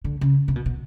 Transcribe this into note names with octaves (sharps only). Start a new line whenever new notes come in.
D3
C#3
C3
B2
B2